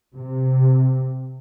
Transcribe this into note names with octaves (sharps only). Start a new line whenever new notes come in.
C3